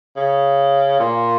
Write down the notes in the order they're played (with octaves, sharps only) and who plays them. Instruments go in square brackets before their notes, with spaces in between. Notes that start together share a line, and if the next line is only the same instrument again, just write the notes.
[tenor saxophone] C#3
A#2